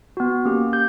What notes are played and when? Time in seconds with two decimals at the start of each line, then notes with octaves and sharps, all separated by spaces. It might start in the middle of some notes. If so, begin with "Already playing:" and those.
0.17 B3 F#4
0.45 A#3 C#4 G4
0.73 G4 G6